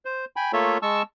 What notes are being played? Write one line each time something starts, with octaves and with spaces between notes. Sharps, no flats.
C5
G5 G#5 B5
A3 A#3 F4 A4 C#5 E5
G#3 A5 C#6 E6